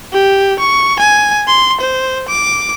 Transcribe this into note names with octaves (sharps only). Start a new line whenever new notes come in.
G4
C#6
G#5
C6
C5
D6